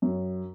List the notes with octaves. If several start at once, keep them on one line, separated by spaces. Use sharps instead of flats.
F#2